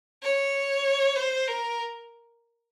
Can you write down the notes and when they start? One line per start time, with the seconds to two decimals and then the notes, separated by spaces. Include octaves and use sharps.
0.23 C#5
1.16 C5
1.48 A#4